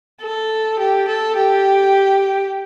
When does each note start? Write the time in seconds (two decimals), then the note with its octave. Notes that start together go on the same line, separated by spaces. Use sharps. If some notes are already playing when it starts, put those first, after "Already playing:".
0.22 A4
0.79 G4
1.08 A4
1.36 G4